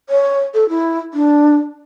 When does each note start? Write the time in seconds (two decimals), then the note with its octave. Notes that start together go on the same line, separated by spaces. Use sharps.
0.09 C#5
0.54 A4
0.69 E4
1.14 D4